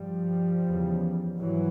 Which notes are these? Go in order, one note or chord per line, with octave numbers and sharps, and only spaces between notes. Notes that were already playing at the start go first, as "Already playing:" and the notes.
Already playing: G2 F3 G3
E2 C#3
G#2 E3 F#3